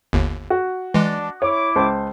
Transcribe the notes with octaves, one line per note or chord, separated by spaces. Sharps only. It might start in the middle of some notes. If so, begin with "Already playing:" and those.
G1 D#2
F#4
E3 G#3 D4
E4 C#5 D6
C#2 C5 A5